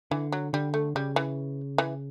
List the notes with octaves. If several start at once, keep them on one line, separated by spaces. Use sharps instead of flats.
D3 E3
F#3
D3 G3
A3
C#3 G3
E3
E3